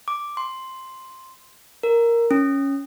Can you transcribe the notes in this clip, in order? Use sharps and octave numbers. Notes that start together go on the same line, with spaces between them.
D6
C6
A#4
C#4